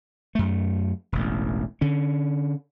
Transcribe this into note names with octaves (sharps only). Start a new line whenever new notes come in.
F#2 A3
E1 A1
D3 C#4